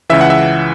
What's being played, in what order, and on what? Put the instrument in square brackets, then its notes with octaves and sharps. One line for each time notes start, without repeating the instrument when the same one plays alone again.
[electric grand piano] C#2 C#3 E3 E5
F#5
E5